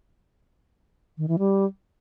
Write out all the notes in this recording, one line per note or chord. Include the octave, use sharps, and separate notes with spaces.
D#3
E3
G3